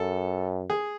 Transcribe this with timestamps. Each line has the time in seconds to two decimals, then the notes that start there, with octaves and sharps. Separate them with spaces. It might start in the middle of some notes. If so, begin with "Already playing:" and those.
Already playing: F#2 A4
0.70 G#4